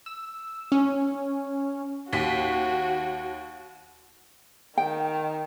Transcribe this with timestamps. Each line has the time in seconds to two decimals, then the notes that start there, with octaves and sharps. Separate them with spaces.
0.06 E6
0.72 C#4
2.13 D#2 F#4 B6
4.78 D#3 G5